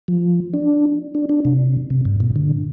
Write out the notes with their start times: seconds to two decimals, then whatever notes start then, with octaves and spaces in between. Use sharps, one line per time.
0.08 F3
0.54 D4
1.15 D4
1.29 D4
1.45 C3
1.90 C3
2.05 G2
2.20 A#2
2.36 D3